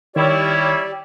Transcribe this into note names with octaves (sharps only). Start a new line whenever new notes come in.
D#3 G3 E4 G4 C#5 D5